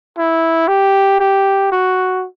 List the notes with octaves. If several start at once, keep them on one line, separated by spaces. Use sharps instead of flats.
E4
G4
G4
F#4